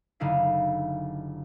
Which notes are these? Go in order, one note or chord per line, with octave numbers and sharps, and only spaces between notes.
F#1 D3 D#4 E4 F5